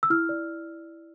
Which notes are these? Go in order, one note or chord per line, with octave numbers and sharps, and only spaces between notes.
E6
E4 F6
D5